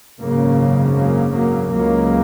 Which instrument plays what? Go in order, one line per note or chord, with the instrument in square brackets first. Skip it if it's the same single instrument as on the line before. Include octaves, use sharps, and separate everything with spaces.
[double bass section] G#1 F#2 C#3 F#3 A#3
F#3 A#3
F#3 A#3
C#2 C#3 F#3 A#3